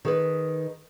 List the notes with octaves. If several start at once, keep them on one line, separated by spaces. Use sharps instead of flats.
D#3 G#4 B4